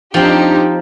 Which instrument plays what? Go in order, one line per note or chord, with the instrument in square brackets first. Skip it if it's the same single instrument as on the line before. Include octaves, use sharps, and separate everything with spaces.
[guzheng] F3 C4 [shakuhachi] D4 [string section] D#4 G4